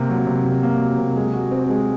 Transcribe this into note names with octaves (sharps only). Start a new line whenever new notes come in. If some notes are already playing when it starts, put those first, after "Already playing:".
Already playing: C3 A#3
F#3
C3
C3
A#3
F#3
C3
G#3
F#4
C4
G#3